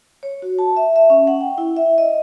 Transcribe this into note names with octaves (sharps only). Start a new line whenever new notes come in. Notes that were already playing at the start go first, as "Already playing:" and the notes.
C#5
F#4
A5
E5
E5
C#4
F#5
G5
E4
E5
D#5